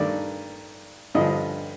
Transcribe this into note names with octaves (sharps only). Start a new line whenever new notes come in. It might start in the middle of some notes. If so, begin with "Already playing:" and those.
Already playing: G2 D#3 A3 D5
G2 D3 F3 D#5